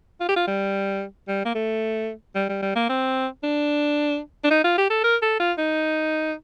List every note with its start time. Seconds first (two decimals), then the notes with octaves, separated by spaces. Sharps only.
0.21 F4
0.28 G4
0.36 F4
0.47 G3
1.28 G3
1.45 A#3
1.55 A3
2.35 G3
2.49 G3
2.62 G3
2.75 A#3
2.89 C4
3.43 D4
4.44 D4
4.50 D#4
4.64 F4
4.78 G4
4.90 A4
5.04 A#4
5.22 A4
5.40 F4
5.58 D#4